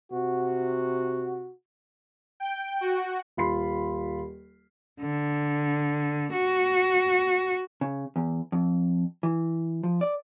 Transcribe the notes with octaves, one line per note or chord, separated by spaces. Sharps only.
C3 F#4
G5
F#4
D#1 F4 B5 C6 C7
D3
F#4
C#3
E2
F2
E3
F3
D5